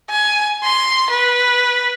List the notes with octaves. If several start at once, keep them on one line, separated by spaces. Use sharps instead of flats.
G#5
C6
B4